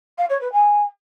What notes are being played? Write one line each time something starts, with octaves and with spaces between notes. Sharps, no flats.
F5
C#5
B4
G#5